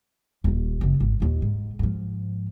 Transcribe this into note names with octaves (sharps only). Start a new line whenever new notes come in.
D#1 D#2
F#1 C#3
G#1
D#2 A#2
G#2
G#2 F3